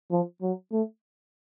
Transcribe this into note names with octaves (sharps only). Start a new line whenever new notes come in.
F3
F#3
A3